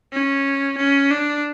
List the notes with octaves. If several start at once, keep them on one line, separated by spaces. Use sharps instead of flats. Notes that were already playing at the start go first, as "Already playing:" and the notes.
C#4
C#4
D4